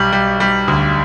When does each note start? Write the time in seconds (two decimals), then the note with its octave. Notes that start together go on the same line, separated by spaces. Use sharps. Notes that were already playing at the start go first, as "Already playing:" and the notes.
Already playing: B1 G3
0.13 G3
0.40 G3
0.68 D2